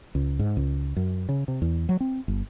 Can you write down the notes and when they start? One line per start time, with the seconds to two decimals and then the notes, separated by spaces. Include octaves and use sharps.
0.15 C#2
0.39 G#2
0.57 C#2
0.96 F#2
1.29 C#3
1.48 C3
1.62 E2
1.89 F#3
2.00 C4
2.28 G1